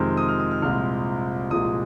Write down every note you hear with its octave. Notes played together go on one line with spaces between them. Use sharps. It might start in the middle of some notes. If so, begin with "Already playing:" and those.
Already playing: F2 C3 D#3 G#3 C4 F6
D#6
F6
D#6
F6
C2 A#2 F3 G#3 C4 F6
C2 A#2 F3 G#3 D#6